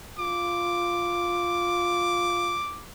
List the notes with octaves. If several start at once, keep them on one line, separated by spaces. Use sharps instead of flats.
F4 D6